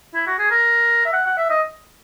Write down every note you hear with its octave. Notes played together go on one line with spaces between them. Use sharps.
E4
F#4
G#4
A#4
E5
F#5
F#5
E5
D#5